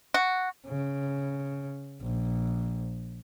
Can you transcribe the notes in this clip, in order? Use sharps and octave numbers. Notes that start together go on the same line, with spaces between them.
F#4
C#3
A#1